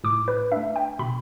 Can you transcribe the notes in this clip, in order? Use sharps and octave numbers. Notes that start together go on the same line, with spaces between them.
A2 D6
B4
A3 D4 E5
G5
B2 B5